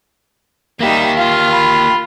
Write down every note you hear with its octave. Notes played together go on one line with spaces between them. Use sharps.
G3 A#3 D#4 G4 E5
F4 F5
B5